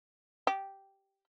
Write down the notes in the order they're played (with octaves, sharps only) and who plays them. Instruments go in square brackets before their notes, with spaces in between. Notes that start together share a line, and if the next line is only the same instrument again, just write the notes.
[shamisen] G4